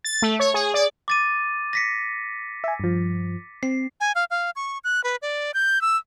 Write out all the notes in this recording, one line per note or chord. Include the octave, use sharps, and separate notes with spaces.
A6
A3
C#5
G#4
D5
D6 A6 D#7
A#6 B6 C#7
E5 G#5
G2 F3
C4 C7
G#5
F5
F5
C#6
F#6
B4
D5
G6
E6